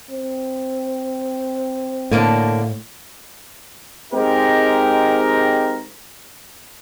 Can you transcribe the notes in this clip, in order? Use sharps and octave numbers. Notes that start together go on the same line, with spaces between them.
C4
A2 D3 A#3 D4
G#3 C4 D#4 G4 A#4